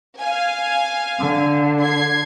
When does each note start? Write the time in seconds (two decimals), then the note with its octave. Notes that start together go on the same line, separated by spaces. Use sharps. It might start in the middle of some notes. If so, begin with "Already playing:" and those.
0.20 F5 G#5
1.19 D3
1.82 G#6 C7